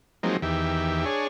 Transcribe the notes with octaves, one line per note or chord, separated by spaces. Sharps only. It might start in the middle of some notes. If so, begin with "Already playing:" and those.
F3 F#3 G#3 A#3 C4 D#4
E2 D#3 G4 E5
D4 G#4 C#5